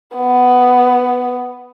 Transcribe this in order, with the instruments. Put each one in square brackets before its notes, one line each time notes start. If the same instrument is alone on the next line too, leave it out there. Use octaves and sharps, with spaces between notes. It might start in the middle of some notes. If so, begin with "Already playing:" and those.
[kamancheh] B3